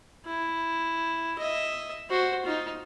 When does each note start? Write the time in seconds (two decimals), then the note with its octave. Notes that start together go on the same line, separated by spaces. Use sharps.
0.26 E4
1.39 D#5 E5
2.10 F#4 C5
2.46 D#4 F4